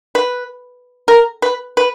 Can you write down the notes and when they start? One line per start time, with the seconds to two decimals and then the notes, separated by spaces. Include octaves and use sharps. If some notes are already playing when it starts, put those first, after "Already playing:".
0.15 B4
1.08 A#4
1.42 B4
1.77 B4